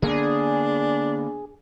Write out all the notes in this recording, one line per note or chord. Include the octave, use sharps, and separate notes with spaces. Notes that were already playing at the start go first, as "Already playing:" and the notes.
D3 A#3 B3 D4 G#4